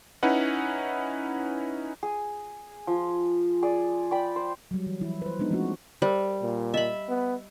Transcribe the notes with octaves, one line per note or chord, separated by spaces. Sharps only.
C#4 D#4 E4 B4 F#5
G#4
F3
G#4 D5
D5 G5 B5
C5
F#3 G3
E3
E3 F3 E4
B4 C5
G#3 B3 D4 D#4
F3 G#3 A3 C4 D4 F#4
G3 A#4 C5
A#2
D#5 E5 B5
B3